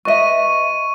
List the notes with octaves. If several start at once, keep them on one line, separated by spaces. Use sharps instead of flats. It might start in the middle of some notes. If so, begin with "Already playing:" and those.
B4 D#5 E5 C#6 D#7